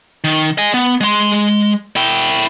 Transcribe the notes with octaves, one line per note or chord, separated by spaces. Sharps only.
D#3
D#5 G#5
B3
G#3 C6
E4 G5